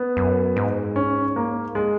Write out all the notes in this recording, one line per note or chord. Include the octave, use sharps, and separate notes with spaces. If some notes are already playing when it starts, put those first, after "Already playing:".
Already playing: B3
F#2
G#2
C#4
A#3
G#3